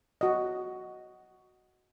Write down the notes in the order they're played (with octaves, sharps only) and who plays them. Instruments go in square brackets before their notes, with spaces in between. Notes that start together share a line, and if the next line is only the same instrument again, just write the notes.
[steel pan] F#4 D#5